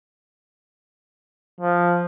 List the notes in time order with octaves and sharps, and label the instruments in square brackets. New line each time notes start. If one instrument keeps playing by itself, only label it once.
[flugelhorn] F3